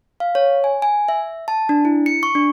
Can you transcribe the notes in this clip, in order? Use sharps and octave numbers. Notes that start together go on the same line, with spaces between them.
F5
C#5
G#5
G#5
E5
A5
D4
E4
C#7
C#6
D4